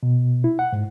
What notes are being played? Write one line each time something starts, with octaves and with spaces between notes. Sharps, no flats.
B2
E4
F#5
G#2